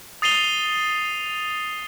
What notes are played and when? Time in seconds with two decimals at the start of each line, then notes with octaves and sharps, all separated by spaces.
0.22 D#6 A6 C7 D#7 F7 G7